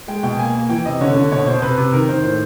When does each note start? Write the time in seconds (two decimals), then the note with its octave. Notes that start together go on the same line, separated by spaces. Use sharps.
0.08 G#3 G5
0.23 B2 G5
0.39 A#3 G#5
0.55 A#3
0.69 E3 G5
0.85 C3 D#5
1.01 D3 C#5
1.16 D3
1.31 B2 C#5
1.47 B2 C5
1.62 C3 B4
1.78 C3
1.93 D#3 A#4
2.09 D#3 C5
2.24 A2 C5